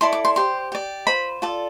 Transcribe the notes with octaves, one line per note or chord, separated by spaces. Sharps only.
E4 A4 D5 C6
D6
C6
G4 C5 C6
G4 D5
F4 C5 B5
F4 A4 D5